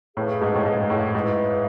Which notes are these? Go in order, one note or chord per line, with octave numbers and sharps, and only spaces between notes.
A2 G#4 B4 F5 A5
G#2
A2
G#2
A2
G#2 E4 B4 F5